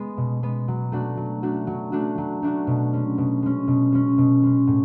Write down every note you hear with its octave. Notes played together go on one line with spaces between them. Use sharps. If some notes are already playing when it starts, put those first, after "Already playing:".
Already playing: G#3 B3
B2
G#3 B3
F#3
A3 D4 F#4
F#3
A3 D4 F#4
F#3
A3 D4 F#4
F#3
A3 D4 F#4
B2
G#3 C#4
B2
G#3 C#4
B2
G#3 C#4
B2
G#3 C#4
A2